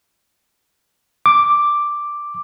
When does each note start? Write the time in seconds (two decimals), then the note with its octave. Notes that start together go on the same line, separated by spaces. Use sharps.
1.26 D6